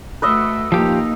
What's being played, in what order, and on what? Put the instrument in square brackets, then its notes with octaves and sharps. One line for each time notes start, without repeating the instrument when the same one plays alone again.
[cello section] A3 F#4 [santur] B4 D#5 E5
[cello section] A#2 A#3 D#4 [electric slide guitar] F3 G4